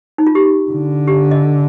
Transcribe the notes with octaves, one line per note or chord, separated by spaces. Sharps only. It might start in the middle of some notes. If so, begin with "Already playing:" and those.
D#4
F4
G4
D3
G4
D#5